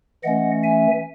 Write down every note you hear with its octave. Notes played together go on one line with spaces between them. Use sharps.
E3 A3 C#4 D#5 F#5
E5 G#5